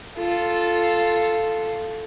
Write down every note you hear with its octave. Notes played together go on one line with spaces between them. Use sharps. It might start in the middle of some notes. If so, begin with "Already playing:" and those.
F4 A4